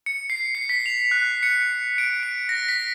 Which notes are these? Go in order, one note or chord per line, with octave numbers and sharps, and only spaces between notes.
C#7
C7
C7
B6
F7
F#6
C#7
D7
D7
A#6
B6